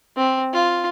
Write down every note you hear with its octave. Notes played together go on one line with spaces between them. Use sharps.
C4
F4